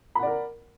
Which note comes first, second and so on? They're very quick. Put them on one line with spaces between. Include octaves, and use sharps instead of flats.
B5 F#5 D5 A#4